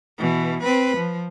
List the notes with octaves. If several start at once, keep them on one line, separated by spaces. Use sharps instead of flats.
B2 E3
C4 B4
F3